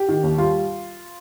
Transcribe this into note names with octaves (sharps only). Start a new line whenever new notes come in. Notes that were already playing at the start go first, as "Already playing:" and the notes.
Already playing: G4
D#3
D#2
G3 F4